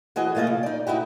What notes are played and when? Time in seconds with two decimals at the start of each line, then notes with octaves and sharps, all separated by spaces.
0.16 E3 F#4 G#4 D#5
0.35 F3 A3 A#3 F4 G#4 D#5
0.47 C3
0.63 D#4 D5
0.87 D#4 E4 F#4 G4